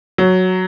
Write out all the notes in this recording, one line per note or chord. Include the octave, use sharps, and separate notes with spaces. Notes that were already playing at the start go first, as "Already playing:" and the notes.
F#3